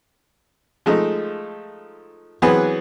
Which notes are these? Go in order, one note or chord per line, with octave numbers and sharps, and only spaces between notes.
F3 G#3 A3 D#4
E3 F#3 B3 C4 G#4 B4